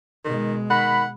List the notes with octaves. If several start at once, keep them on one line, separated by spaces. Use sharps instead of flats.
B2 D#3 G#3
D#3 F#5 B5